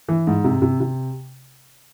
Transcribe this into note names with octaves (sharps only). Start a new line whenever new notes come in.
E3
G#2
C3
C3
C3